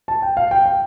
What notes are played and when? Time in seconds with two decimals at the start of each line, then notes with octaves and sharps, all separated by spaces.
0.08 A5
0.22 G5
0.37 F5
0.51 G5
0.66 G5